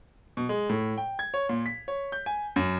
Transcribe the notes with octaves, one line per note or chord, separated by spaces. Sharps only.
B2
G#3
A2
G5
G#6
C#5
A#2
B6
C#5
G6
G#5
F#2